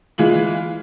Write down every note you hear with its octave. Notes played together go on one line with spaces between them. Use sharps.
E3 G#3 F4 F#7